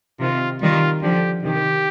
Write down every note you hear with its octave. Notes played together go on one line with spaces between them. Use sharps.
C3 D#3 F4
D#3 G3 F4
D3 F3 G4
C3 D#3 G4